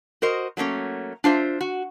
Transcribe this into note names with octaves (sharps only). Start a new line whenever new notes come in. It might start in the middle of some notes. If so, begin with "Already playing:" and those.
F#4 A#4 C5 D#5
F#3 A3 A#3 C#4
D4 F4 C5 E5
F#4